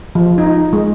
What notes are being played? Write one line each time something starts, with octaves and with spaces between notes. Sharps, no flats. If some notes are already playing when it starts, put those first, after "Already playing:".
F3
D#4
G#3